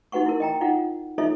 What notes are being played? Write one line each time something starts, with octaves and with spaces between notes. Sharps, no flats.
D#4 F#4 B4 F#5 C#6
E4 A#4
D#5 G5 A#5
D#4 F4 F#5
D#4 F4 A4 C#5 D#5 E5